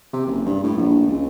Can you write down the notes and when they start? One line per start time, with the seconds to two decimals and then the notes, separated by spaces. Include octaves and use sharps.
0.13 C3
0.27 F#1
0.46 G2
0.64 A2
0.78 A#1
1.07 C#2